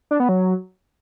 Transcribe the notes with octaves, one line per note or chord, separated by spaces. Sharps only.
D4
B3
F#3